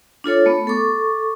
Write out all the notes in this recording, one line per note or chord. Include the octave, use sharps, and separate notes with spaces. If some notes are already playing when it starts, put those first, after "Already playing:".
D4 F4 A4 C#5
A3 B3
A4 C#6 D6